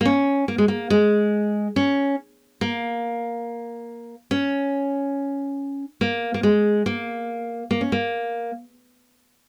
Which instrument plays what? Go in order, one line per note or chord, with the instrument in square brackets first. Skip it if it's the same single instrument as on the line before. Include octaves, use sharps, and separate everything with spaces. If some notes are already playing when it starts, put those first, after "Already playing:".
[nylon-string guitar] A#3
C#4
A#3
G#3
A#3
G#3
C#4
A#3
C#4
A#3
A#3
G#3
A#3
A#3
C#4
A#3